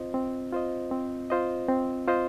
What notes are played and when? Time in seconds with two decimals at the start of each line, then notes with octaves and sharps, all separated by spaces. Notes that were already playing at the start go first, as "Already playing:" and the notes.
Already playing: C4 F4 C5 D#5
0.14 C4
0.53 F4 C5 D#5
0.91 C4
1.30 F4 C5 D#5
1.69 C4
2.08 F4 C5 D#5